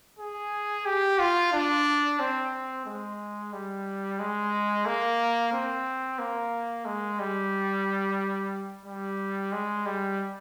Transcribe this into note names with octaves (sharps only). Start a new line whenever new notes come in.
G#4
G4
F4
D4
C4
G#3
G3
G#3
A#3
C4
A#3
G#3
G3
G3
G#3
G3